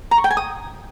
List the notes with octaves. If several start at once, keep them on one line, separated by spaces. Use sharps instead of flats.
A#5
C#6
G5
G#5
D#6